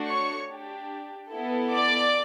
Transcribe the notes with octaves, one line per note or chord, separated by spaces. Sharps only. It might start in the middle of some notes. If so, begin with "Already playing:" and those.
Already playing: A3 D4 F#4
C#5 C#6
D4 G4
B3 E4 A4
D5 D6